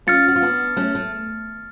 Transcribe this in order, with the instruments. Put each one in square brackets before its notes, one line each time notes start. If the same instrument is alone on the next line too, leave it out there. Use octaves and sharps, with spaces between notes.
[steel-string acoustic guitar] C#4 F4 [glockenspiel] F6 A6 C#7
[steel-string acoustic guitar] F#4
F4
B3 D4
A3 C#4
A3